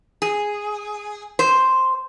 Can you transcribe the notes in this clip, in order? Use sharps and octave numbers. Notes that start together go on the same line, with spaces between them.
G#4
C5